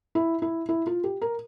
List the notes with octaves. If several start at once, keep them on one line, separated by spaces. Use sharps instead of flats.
E4
E4
E4
F4
G4
A#4